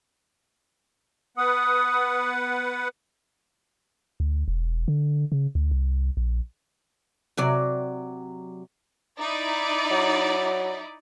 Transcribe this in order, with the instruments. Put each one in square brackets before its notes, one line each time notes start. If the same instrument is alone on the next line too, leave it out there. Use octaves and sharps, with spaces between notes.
[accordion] B3 B4 F#5 [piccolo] D#6
[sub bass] D2
E1
D3
C#3
D2
C2
A#1
[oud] C3 F#3 D5
[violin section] D#4 E4 D5
[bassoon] F#3